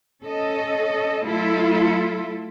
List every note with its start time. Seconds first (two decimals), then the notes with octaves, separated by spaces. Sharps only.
0.22 C#4 A4 D#5
1.24 F#3 A3 E4 F4 A4